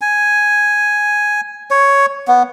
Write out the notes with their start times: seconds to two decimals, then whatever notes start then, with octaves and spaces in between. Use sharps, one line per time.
0.01 G#5
1.71 C#5
2.28 B3